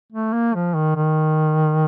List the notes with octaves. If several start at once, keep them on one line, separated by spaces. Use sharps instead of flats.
A3
A#3
F3
D#3
D#3